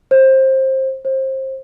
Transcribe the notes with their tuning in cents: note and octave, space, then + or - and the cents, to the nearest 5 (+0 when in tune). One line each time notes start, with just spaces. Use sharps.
C5 +20
C5 +25